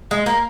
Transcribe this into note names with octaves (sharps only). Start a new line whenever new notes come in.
G#3
A#3